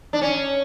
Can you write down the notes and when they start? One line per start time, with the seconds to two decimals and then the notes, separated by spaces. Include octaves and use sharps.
0.13 D4
0.22 C#4